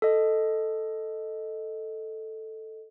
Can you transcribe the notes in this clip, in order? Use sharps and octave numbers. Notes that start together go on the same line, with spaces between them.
A4 D#5